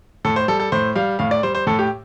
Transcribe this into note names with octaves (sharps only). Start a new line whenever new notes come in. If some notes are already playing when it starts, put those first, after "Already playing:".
A2 A4
C5
G3 A4
A4
A2 C5
G3 F5
A2 F5
D5
G3 C5
C5
A2 A4
G4